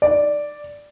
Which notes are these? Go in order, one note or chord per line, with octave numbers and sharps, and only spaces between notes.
D5